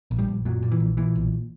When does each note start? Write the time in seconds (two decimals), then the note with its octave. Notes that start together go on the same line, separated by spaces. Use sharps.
0.11 A#1
0.19 G2 G3
0.28 A#1
0.45 F#2 A#2 F#3
0.63 A#2
0.72 E3
0.80 A#1
0.97 A#2 E3
1.16 B1